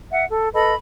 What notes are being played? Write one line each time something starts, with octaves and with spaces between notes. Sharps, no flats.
E5 F#5
A4
A4 B4 D#5 B5